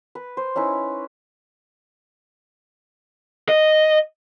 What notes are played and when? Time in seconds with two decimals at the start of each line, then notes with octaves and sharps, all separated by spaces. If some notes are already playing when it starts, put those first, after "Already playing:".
0.15 B4
0.37 C5
0.56 C#4 D#4 E4 B4
3.49 D#5